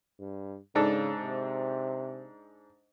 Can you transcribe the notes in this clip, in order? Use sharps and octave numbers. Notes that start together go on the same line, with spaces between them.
G2
G#2 C#3 D4 A4
C3